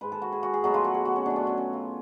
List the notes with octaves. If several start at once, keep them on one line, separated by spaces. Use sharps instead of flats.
G#2 G#3 B4
A4
F#4
G#4
F#4
G#4
B2 F#3 A3 F#4
F4
F#4
G#4
F#4
C#4
B2 A3 D4
D4
C#4
C#4
F4